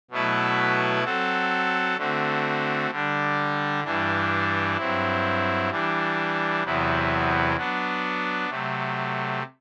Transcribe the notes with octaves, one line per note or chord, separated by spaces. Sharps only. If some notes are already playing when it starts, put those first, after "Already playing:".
B2 F#3 A3 E4 B4
F#3 C4 F#4 A4
D3 A3 C4 F#4
D3 G3 D4
G2 E3 G3 D4
G2 F#3 C4 E4
E3 G3 D4
E2 C3 F#3 B3 E4
F#3 B3 D4
C3 F#3 A3